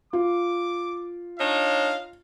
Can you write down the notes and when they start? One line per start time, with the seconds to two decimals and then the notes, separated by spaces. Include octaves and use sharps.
0.13 F4 D6
1.39 D4 D#4 C#5 F5